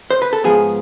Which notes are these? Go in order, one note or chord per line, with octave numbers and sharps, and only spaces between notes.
C5
B4
A4
G#2 F3 B3 G#4